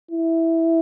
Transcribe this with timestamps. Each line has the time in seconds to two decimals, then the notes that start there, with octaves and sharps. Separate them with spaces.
0.11 E4